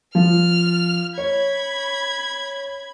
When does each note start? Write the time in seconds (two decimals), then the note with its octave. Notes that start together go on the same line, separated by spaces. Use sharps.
0.15 F3 F6
1.18 C#5 B5 G#6